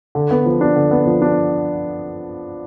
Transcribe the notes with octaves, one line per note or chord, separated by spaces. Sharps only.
D3
B3
F3
D4
D3
B3
F3
D4